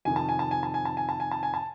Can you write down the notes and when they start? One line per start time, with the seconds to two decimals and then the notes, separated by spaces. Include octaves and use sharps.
0.05 F2 C3 D#3 G#5
0.16 A5
0.29 G#5
0.39 A5
0.51 G#5
0.63 A5
0.74 G#5
0.85 A5
0.97 G#5
1.09 A5
1.20 G#5
1.31 A5
1.43 G#5
1.54 A5